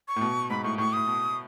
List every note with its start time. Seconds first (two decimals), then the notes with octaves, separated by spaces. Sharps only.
0.08 C#6
0.16 A2
0.21 B2
0.50 G#2 B5
0.64 A2 C#6
0.78 A2 C#6
0.93 A2 D#6
1.07 B2